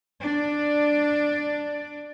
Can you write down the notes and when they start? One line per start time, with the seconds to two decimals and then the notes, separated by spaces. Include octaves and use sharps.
0.20 D4 D5